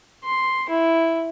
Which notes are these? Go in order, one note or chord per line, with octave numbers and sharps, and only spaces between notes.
C6
E4